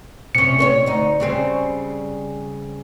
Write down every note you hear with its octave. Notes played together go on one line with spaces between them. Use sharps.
C3 C#4 C#7
A3 C5 C#5
D2 D#4
C#3 G3 C4